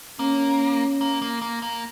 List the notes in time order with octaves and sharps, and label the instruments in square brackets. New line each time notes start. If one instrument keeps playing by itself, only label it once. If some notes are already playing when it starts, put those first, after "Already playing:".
[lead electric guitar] A#3 [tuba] C#4
[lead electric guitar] A#3
A#3
A#3
A#3